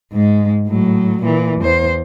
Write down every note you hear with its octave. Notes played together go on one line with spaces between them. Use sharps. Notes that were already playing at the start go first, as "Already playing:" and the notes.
G#2 G#3
A2 F#3
A#2 E3
E2 C5